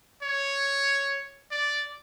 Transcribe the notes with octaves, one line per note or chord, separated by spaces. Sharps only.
C#5
D5